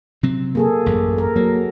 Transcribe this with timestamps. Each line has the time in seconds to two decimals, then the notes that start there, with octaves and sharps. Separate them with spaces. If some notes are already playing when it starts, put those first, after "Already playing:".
0.23 C3 F#3 C4
0.55 A#3 G#4 A4
0.86 A1 F#2
1.18 A#4
1.36 F#3 A#3